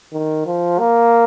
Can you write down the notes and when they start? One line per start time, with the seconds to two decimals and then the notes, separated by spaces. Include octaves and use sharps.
0.12 D#3
0.46 F3
0.79 A#3